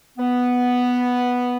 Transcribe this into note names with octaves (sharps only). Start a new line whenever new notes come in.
B3